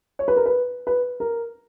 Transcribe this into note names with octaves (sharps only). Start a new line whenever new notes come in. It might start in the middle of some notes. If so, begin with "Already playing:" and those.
C#5
B4
A#4
B4
B4
A#4